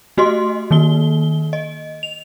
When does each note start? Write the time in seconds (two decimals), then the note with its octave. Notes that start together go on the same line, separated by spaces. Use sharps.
0.17 A3 F#4 G4 D#5 C6
0.71 D#3 A#3 G7
1.53 D#5
2.03 F7